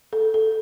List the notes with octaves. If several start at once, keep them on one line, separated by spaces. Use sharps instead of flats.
A4
A4